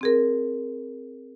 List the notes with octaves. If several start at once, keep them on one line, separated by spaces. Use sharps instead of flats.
C4 G#4 A#4